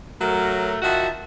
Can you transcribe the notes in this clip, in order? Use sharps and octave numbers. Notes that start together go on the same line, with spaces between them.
F#3 A3 A#4
D#3 F4 F#4 E5 F#5 A5